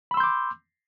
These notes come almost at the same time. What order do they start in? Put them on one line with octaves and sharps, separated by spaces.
B5 E6 C6 G6 D6